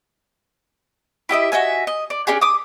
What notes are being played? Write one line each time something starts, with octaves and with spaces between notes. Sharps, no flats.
E4 G4 D#5 E5
F#4 D#5 E5 G#5
D#5
D5
C#4 D4 G4 G#4
D6 D#6